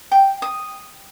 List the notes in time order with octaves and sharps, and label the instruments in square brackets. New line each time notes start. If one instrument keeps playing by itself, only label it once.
[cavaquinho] G5
D#6